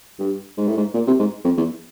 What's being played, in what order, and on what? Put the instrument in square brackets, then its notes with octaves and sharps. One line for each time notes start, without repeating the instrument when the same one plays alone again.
[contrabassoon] G2
G#2
A2
G#2
A#2
C3
G#2
F2
E2